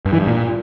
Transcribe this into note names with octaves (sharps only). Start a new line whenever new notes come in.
G2
E3
G2
A#2